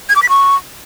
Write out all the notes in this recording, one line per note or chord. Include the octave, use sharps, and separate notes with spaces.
G#6
D6
B6
C#6